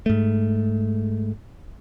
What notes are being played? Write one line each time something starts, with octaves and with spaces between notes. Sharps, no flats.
G#2 A3